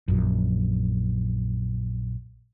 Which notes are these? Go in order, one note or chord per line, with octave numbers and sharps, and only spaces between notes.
A#1 F#2